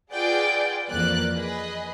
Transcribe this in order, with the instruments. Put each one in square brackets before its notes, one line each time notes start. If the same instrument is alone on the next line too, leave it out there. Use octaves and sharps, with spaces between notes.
[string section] F4 G#4 B4 D5 F#5 G5
F2 E3 A#3 D5 F#6
G#4 B4 D#5 B5